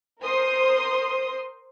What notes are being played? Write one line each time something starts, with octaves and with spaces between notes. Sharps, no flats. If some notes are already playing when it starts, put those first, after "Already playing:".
A#4 C5 C6 D#6